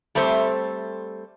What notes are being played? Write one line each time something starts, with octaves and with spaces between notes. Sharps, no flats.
G3 A3 C4 C5